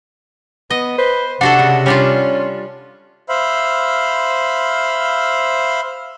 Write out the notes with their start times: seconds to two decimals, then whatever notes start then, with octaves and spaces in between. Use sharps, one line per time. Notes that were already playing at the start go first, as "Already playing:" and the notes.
0.70 B3 D#5
0.98 B4 C5
1.41 C3 D4 F#4 A4 F#5
1.59 C#3
1.86 G3 C#4 D4 F4
3.29 C5 E5 F5 B5